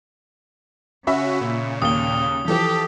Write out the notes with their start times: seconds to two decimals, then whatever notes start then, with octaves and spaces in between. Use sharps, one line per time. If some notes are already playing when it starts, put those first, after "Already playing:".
1.07 C#3 C#4 F#4 E5 B5 C#6
1.41 A#2
1.82 D#2 A#3 D#6 G7
2.48 E3 F3 G4 A4